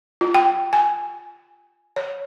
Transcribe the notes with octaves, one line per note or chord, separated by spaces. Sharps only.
F4
G5
G#5
C#5